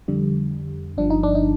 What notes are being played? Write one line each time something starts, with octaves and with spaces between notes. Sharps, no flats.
F2 D3 G3
G1 G2 F3 D4
D#4
D4
D#4